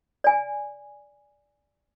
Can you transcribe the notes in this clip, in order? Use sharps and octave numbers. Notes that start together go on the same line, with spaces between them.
D5 G#5